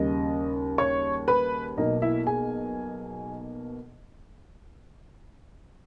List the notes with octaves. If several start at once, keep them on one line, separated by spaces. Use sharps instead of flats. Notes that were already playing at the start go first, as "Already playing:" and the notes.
Already playing: D#2 C#3 G3 D#5
C#5 C#6
B4 B5
B1 B2 A#3 D#4 D#5
E4 E5
G#4 G#5